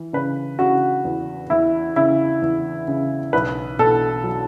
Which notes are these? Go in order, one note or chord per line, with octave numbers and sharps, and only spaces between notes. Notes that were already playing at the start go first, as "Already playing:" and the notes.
Already playing: E3
C#3 B4
C#3 F#4
E2
E2 E4
C#3 E4
E2
C#3
B1 B4
B2 A4
F#3